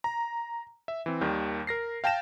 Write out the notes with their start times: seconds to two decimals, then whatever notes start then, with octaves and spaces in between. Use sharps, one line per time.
0.04 A#5
0.88 E5
1.06 E3 C4
1.21 D#2 D#3 G3
1.67 A#4 A#6 C7
2.04 F5 G5 A5 A#6 E7